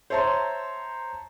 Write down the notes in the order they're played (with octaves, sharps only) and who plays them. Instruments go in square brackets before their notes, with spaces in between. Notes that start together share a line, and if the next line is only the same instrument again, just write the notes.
[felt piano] C5 C#5 E5 A5 A#5 C6